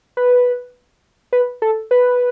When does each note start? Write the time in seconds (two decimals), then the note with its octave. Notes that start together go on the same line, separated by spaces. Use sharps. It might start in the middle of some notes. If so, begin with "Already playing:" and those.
0.17 B4
1.33 B4
1.62 A4
1.91 B4